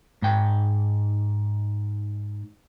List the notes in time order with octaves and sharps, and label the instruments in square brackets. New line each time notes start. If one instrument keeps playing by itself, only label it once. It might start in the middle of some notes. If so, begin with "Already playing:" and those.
[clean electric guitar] G#2 G5